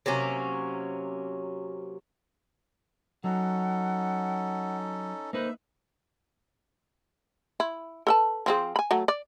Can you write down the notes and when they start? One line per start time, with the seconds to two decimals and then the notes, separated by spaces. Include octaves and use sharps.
0.06 C3 F#3 A#3 C#4
3.24 F#3 C#4 D#4 A4 F#5
5.33 A#3 D#4 B4 C5 E5
7.60 E4
8.07 A4 B4 A5
8.46 F3 C4 G#4
8.76 G#5 B5
8.91 F#3 A3
9.08 D5